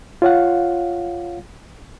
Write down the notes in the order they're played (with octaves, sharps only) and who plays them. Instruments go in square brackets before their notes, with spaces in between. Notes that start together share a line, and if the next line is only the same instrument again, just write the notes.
[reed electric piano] F4 C#5 F5 F#5